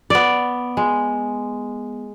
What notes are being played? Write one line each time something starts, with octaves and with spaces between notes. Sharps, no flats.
B3 D5
G#3